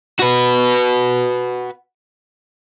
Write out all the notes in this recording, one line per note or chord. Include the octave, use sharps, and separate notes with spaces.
F#4 B4